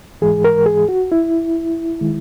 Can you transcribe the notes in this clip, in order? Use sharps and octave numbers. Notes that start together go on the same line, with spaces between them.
G#2 E3 G#3 G#4
A#4
G#4
F#4
E4
D#3 G#3